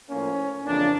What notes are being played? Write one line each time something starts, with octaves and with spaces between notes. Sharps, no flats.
A2 F3 A#3 C#4
F2 C#3 E3 A#3 D4